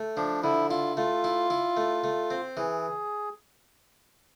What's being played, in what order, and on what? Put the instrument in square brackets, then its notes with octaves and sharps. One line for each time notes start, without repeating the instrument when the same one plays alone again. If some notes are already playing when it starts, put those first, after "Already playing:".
Already playing: [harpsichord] A3
[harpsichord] F3 [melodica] D4
[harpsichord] D3 [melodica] E4
[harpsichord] E4 [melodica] F4
[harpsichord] A3 [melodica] F4
[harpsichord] E4
E4
A3
A3
C4
[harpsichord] E3 [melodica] G#4